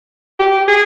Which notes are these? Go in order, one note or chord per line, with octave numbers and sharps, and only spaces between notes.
G4
G#4